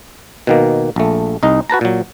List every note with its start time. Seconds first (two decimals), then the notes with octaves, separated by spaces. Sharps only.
0.47 B2 D#3 A#3
0.96 A#1 A3
1.43 C2 D#4 D#5
1.70 F#4 B4 A5 A#5
1.81 A#2 F#3